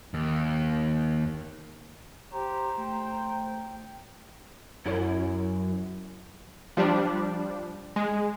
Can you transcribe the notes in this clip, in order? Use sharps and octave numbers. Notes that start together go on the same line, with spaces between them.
D#2
G4 C5 A#5
A3 G5
F#2 E4
F3 G3 D4
G#3